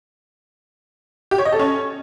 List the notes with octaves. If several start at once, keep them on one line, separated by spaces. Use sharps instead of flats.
G4
C#5
D#5
A4
C#4